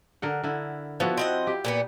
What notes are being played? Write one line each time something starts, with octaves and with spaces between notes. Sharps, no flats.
D3 A#4 F#5
D3 E4
F3 B3 E4 F#4
C4 D#5 F#5
G4
A#2 A#3 B3